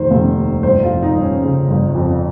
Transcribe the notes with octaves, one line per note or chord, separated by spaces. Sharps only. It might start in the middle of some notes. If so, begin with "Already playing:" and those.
Already playing: F1 D#3 C5
F1
D#2
G1 C5
F4
F2
D#4
G1
C#4
C#3
G1
F2